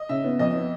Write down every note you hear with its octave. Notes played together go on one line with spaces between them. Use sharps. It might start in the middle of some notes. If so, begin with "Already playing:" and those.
Already playing: D#5
C#3 E5
B3
F2 D#5
B3